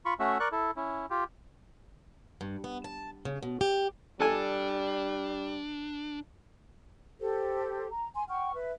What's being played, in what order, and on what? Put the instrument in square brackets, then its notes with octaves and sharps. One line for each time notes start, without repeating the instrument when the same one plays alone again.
[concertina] F4 B5 C#6
A3 C#4 F#4 E5
A#4 D5 C#6 F#6
E4 A4
C#4 E4
F4 G4
[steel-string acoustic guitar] G2
B3
A5
C#3
B2
G4
[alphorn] G3 [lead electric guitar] D4 [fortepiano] A4 G#5
[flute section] G4 A4 C5
A#5
G#5 C6
F#5 G5 C#6 F6
B4 E5